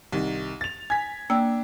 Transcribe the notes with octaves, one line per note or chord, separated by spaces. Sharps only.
C2 D#3
A6 F7
G#5 G#6 B6
A#3 D4 G5 E6